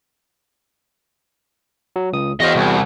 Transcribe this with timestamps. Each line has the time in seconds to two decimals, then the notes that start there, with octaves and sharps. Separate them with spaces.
1.96 F#3
2.13 C#2 D#6
2.40 E2 F#4 C5 D#5 F5
2.55 C2